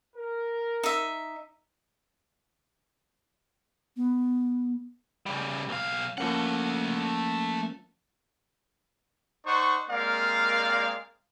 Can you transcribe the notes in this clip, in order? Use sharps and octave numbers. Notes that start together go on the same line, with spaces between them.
A#4
D#4 E5
B3
C#3 G3
B1 F5
F3 A3 A#3 C#4 F#5
D#4 C5 D5 F#5 C#6
G#3 A#3 C4 A#4 D5 F5